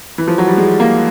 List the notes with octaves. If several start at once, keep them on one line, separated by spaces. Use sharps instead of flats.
E3
F3
F#3
G3
G#3
A#3